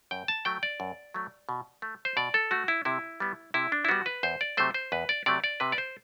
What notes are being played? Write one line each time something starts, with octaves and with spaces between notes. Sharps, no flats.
F#2 G5
A5
F#3 A3 G5
D5
F#2
F#3 A3
B2
A3
C5
B2 D5
A4
A3 F#4
E4
C3 E4
G3 B3
C3 E4
D4
E4
G3 B3 F#4
B4
E2 C5
D5
C3 F#3 A3 C5
C5
E2 B4
D5
C3 F#3 A3 D5
D5
C3 B4
D5
C5